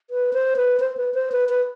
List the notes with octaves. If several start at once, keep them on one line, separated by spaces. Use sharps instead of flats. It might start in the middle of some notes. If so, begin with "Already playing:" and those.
B4
C5
B4
C5
B4
C5
B4
B4